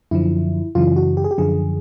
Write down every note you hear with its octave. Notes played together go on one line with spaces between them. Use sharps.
F#2 D3 F3 E4
F#2 C#3 E3 F4
F#4
G4
G#4
G4
F#2 D3 F3 G#4